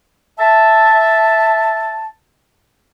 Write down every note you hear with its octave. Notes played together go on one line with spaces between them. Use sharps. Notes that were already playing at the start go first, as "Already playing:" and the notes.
E5 A5